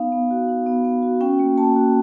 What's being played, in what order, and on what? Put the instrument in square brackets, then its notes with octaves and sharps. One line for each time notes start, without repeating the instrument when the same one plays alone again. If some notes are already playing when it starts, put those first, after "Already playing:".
Already playing: [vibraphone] B3 D#4 F5
B3
F#4
D#4
B3
B3
F#4
C#4 G5
A#3
A#3 A5
F#4